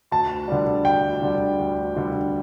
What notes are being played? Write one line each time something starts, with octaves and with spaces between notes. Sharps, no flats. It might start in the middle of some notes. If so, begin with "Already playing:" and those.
D2 A5
D3 G3
D2 G5
D3 G3
D2
D3 G3